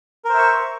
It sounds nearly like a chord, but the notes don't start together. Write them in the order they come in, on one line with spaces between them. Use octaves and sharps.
A#4 C5 E5 C#6